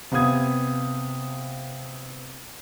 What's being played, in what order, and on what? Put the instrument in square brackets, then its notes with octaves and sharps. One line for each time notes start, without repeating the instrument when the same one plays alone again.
[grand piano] C3 B3 F5 D#6 G#6